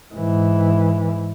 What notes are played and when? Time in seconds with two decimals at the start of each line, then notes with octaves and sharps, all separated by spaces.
0.14 G#2 E3